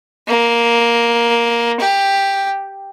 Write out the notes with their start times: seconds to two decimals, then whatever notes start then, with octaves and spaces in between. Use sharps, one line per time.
0.28 A#3
1.80 G4